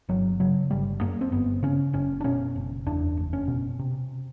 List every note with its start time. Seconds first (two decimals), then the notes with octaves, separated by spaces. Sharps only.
0.09 G1 F#3
0.40 C#3 F#3
0.71 G1 G3
1.01 F#2 A#3
1.21 C4
1.32 G1 B3
1.63 C#3 C#4
1.93 F#1 C#4
2.21 D4
2.24 B2 C#4
2.56 F#1
2.86 E2 D4
3.17 F#1
3.33 C#4
3.48 B2
3.79 C3